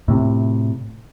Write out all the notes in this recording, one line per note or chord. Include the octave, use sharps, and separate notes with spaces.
A2 C3